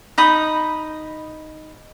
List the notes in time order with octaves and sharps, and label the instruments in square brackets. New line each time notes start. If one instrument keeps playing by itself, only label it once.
[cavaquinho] D#4 B5 D#6